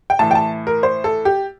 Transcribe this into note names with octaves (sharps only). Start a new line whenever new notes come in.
G5
A2 E3 A5
G5
A5
A#4
C5
A4
G4